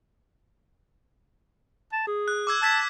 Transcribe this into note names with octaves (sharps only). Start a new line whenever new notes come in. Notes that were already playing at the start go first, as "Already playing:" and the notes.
A5
G#4
F#6
D6 E6 G#6
A5 E6 G#6 B6